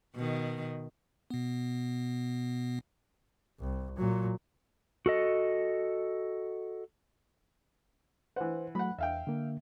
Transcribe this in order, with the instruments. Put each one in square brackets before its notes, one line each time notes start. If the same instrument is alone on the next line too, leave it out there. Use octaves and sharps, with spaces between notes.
[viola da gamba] B2 D#3
[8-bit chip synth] B2 B3
[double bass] C2
A#2 F#3
[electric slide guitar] F#4 A4 D#5
[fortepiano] E3 F#5 [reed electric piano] B4 C5
[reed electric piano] F#3 A3 [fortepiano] F#5 B5
[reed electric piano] E2 [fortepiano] E5 F5 G5
[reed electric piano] D3 A#3